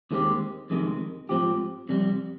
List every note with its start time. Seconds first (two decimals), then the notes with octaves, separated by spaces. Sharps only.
0.11 D#2 D#3 G#3 C4 G4
0.70 F2 C3 D#3 G#3
1.29 G#2 F3 C4 G4
1.89 F2 C3 G3